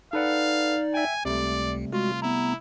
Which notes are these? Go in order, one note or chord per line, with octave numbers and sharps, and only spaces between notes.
D#4 A4 B4 D5 F5 F#5
E5 G5 G#5
C#2 C3 G3 A3 D5
G#3 F4 F#4
B3 E4 A#5